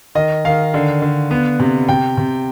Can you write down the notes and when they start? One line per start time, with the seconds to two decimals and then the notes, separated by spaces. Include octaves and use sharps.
0.15 D#3 D#5
0.45 D#3 F5
0.74 D3
1.02 D3
1.31 B3
1.60 C3
1.89 C3 G5
2.17 C3